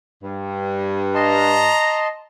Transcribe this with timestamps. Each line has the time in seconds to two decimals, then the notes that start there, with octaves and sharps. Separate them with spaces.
0.23 G2
1.15 D#5 A5 A#5 C6